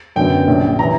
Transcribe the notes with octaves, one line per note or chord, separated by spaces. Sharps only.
F#2 D3 F#3 B3 G5
A#1 A#2 G3 C#4
E3 A#5